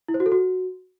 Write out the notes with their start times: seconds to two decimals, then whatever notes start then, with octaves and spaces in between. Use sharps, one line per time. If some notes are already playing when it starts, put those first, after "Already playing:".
0.08 E4
0.14 C5
0.20 F#4
0.26 A4
0.32 F#4